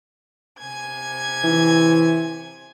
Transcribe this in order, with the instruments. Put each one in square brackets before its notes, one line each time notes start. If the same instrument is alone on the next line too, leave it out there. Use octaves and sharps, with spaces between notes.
[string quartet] C3 G#5 G#6
[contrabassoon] E3